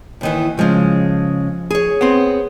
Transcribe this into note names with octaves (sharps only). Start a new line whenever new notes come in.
D#2 D#3 E3
C#3 F3 G#3
G#4 C#5
B3 C4